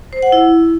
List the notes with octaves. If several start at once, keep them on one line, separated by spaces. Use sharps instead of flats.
C5
F#5
E4